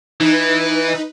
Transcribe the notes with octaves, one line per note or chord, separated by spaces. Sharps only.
E3 D#4 B4